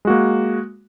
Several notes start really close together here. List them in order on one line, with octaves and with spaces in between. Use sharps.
G#3 F#4 A#3